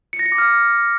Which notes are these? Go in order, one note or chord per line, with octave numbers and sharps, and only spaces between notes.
C#7
A#6
C#7
D6
F6